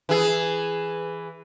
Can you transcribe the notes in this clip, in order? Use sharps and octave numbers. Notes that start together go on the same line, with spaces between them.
E3 G#4